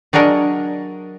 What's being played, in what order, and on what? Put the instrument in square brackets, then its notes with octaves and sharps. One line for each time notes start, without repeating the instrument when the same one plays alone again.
[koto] F#3 D4 G#4 A#4 C#5 D#5